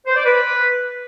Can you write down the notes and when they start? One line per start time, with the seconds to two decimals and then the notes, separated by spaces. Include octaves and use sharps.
0.07 C5
0.16 D5
0.26 B4